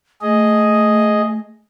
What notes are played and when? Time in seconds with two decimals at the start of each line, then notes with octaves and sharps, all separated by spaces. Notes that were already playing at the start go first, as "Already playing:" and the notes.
0.22 A3 G#4 D#5